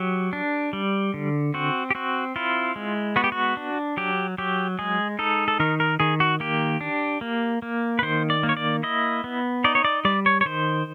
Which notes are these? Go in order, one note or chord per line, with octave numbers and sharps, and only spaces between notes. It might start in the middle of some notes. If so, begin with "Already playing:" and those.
Already playing: F#3 G4
D4
G3
D3
C4 F#4
G4
C4 F#4
E4 F4
G#3
B3 F#4
G4
F#4
D4
F#3 G4
F#3 G4
G#3 G#4
D#4 A4
A4
D#3 A#4
A#4
D#3 G#4
F#4
A#3 G4
D4
A#3
A#3
B4
D#3 C5
D5
A#3
C#5
D5
E4 D#5
B3
D#4 D5
C#5
D5
G3 D5
C#5
C#5
D#3 C5